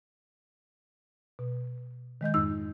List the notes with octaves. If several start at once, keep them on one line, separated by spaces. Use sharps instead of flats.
B2
D#3 G#3 D#5 G6
F2 G#2 D#4 E6